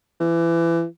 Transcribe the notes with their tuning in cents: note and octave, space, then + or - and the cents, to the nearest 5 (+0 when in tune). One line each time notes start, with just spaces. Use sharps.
E3 +25